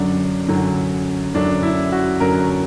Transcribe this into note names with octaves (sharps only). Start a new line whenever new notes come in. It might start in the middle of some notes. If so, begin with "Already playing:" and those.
Already playing: F#2 D3 F#3 D4
F#2 D3 F#3
F#2 D3 F#3 D4
E4
F#4
F#2 D3 F#3 A#4